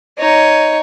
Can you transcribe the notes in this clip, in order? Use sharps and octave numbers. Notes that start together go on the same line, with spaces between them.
D#4 C#5